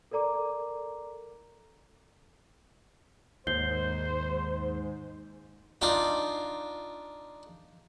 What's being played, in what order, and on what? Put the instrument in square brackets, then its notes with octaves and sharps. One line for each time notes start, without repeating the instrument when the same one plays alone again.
[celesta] A4 A#4 D5 A#5 D6
[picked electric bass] D#2 [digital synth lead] G#2 [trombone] C5 [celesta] G6 C7 G7
[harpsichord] D4 D#4 F4 G5